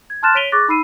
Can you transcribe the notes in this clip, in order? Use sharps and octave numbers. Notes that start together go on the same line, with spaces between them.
G#6
A5 C6 F6 F#6 A6 E7
C#5 B6 D7 D#7 F7 G7
G#4 C#6 D6 F#6 A6 A#6
D#4 B5 E6 C7 D#7